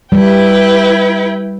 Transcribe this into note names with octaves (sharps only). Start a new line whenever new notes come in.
G3 E4 B4 G5